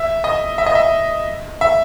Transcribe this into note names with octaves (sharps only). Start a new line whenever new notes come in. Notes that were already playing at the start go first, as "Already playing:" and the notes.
Already playing: E5
D#5
E5
D#5
E5
E5